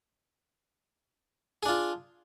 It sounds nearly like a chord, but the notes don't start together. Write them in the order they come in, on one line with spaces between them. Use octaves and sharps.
G#4 D4 F4